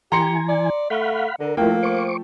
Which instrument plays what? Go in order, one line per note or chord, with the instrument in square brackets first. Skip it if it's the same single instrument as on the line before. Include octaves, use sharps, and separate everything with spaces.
[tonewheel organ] E3 G#5 [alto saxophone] G4 [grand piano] A#5 C6 C#7
[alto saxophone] D5
[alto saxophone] A3 [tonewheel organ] F5 F#5 B5
[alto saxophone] D3 [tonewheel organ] A#4
[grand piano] F3 A3 G5 [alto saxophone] A#3 [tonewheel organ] E4 A#4
[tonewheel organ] C5 C#6 D6